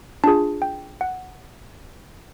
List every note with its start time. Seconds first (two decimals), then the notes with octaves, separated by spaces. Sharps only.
0.24 D4 F4 G#4 A5
0.62 G5
1.01 F#5